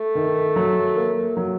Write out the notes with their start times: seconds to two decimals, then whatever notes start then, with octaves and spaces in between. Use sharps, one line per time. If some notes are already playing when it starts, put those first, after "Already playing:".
Already playing: A3
0.15 D#3
0.56 F#3
0.96 A#3
1.37 F#3